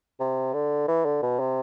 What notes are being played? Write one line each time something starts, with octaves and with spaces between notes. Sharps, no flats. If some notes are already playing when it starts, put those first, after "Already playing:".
C3
D3
E3
D3
B2
C3